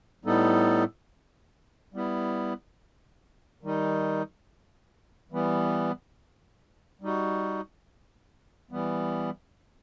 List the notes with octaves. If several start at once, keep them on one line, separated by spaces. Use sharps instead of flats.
A2 G3 B3 D#4 A4
G3 B3 E4
D#3 G3 D#4
E3 G3 B3
G3 D#4 F#4
E3 G3 B3